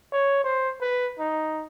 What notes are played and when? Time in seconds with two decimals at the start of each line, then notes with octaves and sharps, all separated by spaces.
0.12 C#5
0.44 C5
0.81 B4
1.19 D#4